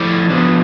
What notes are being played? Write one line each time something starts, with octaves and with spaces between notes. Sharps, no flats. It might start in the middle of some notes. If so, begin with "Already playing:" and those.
Already playing: F3 A3 E4 D5
F3 B3 D4